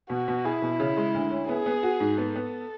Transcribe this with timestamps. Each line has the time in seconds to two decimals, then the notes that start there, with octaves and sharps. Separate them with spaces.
0.10 B2 F#4
0.28 B2
0.45 E4 G#4
0.62 B2
0.80 C#3
0.97 G#3
1.14 D2
1.31 C#4
1.49 B3 G#4
1.66 B3
1.83 F#4
2.00 G#2
2.17 B3 A4
2.36 B3